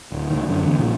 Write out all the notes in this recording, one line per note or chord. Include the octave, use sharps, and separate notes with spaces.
D1
C#2 D#3
F#2 D3
E2 D3
A#1 A#2 C#3